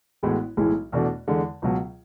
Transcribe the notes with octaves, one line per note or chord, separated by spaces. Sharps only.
A1 A2 G#3 B3 F#4
B1 A2 E3 G#3
E2 B2 A3 D4 F#4
E2 D3 G#3
C#2 B2 F#3